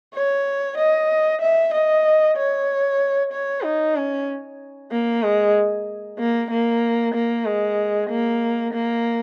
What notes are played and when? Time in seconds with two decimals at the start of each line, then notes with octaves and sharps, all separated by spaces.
0.15 C#5
0.77 D#5
1.41 E5
1.73 D#5
2.36 C#5
3.32 C#5
3.64 D#4
3.96 C#4
4.91 A#3
5.23 G#3
6.19 A#3
6.51 A#3
7.14 A#3
7.46 G#3
8.10 A#3
8.73 A#3